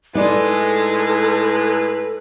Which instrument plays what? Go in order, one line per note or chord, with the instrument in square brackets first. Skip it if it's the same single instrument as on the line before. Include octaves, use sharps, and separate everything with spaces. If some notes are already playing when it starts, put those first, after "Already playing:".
[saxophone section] A2 B4 [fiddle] G#3 [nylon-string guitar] D#4 D5 [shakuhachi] A4